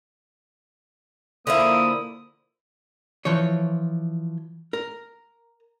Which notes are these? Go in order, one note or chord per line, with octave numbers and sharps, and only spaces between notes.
D3 F3 A#3 E4 D#6
E3 F3 C#5
A#4